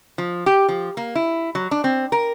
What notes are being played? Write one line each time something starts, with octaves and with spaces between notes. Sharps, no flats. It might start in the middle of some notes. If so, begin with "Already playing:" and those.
F3
G4
F3
A#3
E4
F#3
D4
C4
A#4